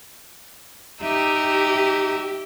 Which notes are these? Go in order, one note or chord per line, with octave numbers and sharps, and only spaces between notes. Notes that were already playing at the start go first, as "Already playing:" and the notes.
D#4 G4 E5